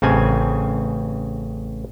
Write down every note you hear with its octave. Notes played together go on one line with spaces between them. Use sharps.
A1 C#3 C4 G#5